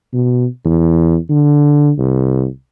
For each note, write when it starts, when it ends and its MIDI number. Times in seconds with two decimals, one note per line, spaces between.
0.13 0.46 47
0.65 1.17 40
1.30 1.91 50
1.98 2.46 36